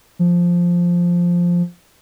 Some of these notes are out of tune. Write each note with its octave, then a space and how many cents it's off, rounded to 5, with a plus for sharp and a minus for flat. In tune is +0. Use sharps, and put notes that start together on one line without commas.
F3 +0